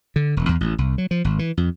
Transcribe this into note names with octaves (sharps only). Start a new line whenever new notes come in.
D3
E1
E2
A1
C2
F#3
F3
G#1
E3
F2